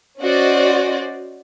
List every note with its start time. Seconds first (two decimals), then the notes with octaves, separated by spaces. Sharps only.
0.20 C#4 F#4 C5 D5 D#5